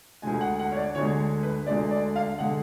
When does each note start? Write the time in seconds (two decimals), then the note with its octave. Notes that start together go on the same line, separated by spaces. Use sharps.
0.22 D2 D3 G#3 G#5
0.41 F#5
0.59 F#5
0.72 C#5
0.77 D5
0.95 D2 D3 G#3 C#5
1.43 B4
1.66 D2 D3 G#3 D5
1.91 D5
2.16 F5
2.38 D3 G#3 F#5